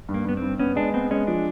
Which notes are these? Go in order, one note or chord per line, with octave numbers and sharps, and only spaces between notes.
G2
A#3
G2 B3
G2 C4
B3 C#4
G#3 D4
B3 C4
G#3 C#4
F3 D4